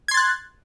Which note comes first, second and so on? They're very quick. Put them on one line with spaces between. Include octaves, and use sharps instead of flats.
G#6 C6 A6 F#6